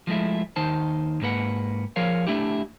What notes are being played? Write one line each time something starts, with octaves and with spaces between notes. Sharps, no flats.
F3 G#3 A3 E4
D#2 D#3 D#4 C5 A5
G#2 A#3 B4 F#5
F3 G#4 A#4 C#5 F5
A3 D4 E4 G4